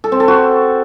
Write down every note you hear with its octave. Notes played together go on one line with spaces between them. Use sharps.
A4
C4
A4
F#4